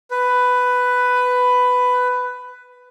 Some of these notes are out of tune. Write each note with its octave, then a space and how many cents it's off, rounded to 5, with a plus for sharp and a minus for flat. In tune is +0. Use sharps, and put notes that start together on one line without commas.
B4 +10